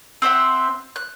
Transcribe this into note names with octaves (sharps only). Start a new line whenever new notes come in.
C4 C5 E5 F#5
F#6